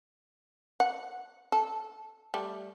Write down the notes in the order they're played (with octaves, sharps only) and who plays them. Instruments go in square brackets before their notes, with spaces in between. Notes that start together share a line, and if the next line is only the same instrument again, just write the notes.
[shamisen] F#5
A4
G3 A3